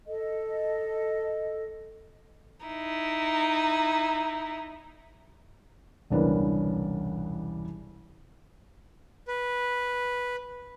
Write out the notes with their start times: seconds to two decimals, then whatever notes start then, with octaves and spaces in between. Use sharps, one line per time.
0.07 A4 D#5
2.66 D#4 E4
6.10 E1 C2 C#3 D4 A#4 B4
9.28 B4